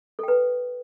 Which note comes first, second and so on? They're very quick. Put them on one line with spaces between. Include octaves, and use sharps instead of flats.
A4 G5 B4